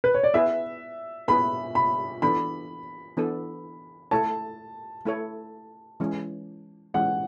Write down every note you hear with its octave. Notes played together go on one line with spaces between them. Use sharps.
B4
C#5
D5
B3 E4 G#4 B4 E5
B3 E4 G#4 B4 B5
B5
E3 B3 D4 A4 B5
E3 B3 D4 A4
A3 E4 A4 C#5 A5
A3 E4 A4 C#5
E3 G#3 C#4
E3 G#3 C#4 F#5